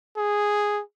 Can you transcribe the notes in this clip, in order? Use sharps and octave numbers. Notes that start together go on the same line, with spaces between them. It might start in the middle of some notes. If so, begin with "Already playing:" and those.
G#4